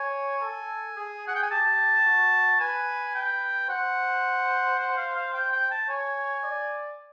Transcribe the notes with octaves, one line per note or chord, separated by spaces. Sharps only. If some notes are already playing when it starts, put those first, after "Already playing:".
Already playing: C#5 G#5
A4
G#4
F#5
G5
G#5
G4 A5
F#4
B4 G#5
G5
C5 F#5
F#5
F5
F5
G5
G5
A5
C#5 G#5
D5